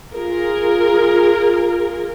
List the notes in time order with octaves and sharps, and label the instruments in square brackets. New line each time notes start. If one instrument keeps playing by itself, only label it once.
[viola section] F4 G#4 A#4